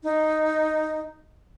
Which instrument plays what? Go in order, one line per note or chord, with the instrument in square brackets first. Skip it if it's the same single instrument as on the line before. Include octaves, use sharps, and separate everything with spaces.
[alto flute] D#4